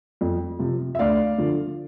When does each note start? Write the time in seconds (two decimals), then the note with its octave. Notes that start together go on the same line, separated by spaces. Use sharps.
0.21 F2
0.59 C3 F3
0.95 E5
0.99 D2 D5 F5
1.38 D3 F3